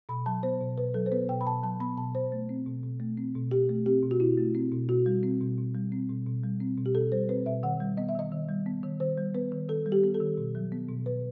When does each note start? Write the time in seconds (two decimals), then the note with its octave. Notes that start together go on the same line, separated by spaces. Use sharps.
0.09 B2 B5
0.26 F#3 A5
0.43 B3 C5
0.60 B2
0.78 B2 B4
0.94 F#3 A4
1.06 C5
1.12 B3 B4
1.29 B2 G5
1.41 B5
1.46 B2 A5
1.63 F#3 A5
1.80 B3 B5
1.97 B2 A5
2.15 B2 C5
2.32 A3
2.49 C4
2.66 B2
2.84 B2
3.00 A3
3.18 C4
3.35 B2
3.51 B2 G4
3.69 A3
3.86 C4 G4
4.03 B2
4.11 F#4
4.20 B2 E4
4.37 A3
4.55 C4
4.72 B2
4.89 B2 F#4
5.06 G3
5.23 C4
5.41 B2
5.58 B2
5.74 G3
5.92 C4
6.09 B2
6.26 B2
6.43 G3
6.60 C4
6.77 B2
6.86 G4
6.95 B2 A4
7.12 G3 C5
7.29 C4 B4
7.46 B2 E5
7.63 D#3 F#5
7.80 G3
7.97 B3 D#5
8.09 E5
8.15 D#3 D#5
8.31 D#3
8.49 G3
8.66 B3
8.83 D#3
9.00 D#3 C5
9.17 G3
9.35 B3 B4
9.52 D#3
9.69 D#3 A4
9.86 G3
9.92 G4
10.03 B3
10.14 A4
10.20 D#3
10.37 B2
10.55 F#3
10.72 B3
10.89 B2
11.06 B2 B4